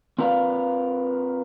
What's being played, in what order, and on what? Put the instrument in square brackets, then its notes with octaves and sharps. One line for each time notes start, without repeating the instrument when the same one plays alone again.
[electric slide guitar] C4 F4 A#4 B4 D5 F5